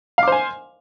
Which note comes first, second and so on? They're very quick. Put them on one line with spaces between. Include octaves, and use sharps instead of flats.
F5 D6 C5 G#5